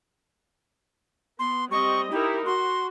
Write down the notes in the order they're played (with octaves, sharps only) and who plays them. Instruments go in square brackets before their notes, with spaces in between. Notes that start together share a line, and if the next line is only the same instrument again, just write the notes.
[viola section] B3 [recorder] C6
[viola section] G3 C4 D#5 [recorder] C#6
[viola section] D#4 E4 A#4 [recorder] G4
[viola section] F#4 [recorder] C6